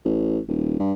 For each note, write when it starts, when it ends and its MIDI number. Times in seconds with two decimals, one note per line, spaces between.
0.05 0.39 33
0.49 0.78 27
0.80 0.93 43